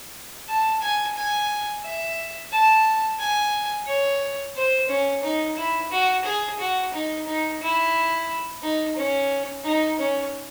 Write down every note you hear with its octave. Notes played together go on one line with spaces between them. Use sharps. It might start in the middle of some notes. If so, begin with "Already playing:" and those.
A5
G#5
G#5
E5
A5
G#5
C#5
C5
C#4
D#4
E4
F#4
G#4
F#4
D#4
D#4
E4
D#4
C#4
D#4
C#4